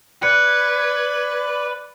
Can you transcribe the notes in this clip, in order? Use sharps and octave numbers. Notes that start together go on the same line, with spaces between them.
B4 D5 F#6 G#6 C#7